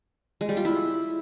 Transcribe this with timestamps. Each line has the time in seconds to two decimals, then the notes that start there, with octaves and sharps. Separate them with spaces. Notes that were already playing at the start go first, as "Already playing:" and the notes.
0.41 G#3
0.49 G3
0.57 F4
0.65 E4